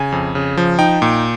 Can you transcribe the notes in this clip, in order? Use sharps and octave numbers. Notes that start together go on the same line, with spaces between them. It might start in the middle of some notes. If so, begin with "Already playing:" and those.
Already playing: C#3 G#5
F2
C#3
F3
D#4 G5
A#2